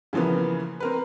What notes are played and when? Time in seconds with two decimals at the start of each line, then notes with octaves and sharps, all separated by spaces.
0.13 C#3 E3 F3 A#3 B3
0.80 C4 A#4 B4